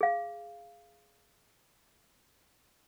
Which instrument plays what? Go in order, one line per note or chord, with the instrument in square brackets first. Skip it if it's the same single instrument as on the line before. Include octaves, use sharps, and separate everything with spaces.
[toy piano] G#4 F5